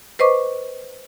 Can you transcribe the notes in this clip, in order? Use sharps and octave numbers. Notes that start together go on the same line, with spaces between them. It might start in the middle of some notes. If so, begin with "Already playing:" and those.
B4 C5 D#5 C#6 D6